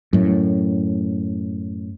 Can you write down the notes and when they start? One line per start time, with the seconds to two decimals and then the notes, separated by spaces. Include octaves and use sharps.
0.13 F#2 A2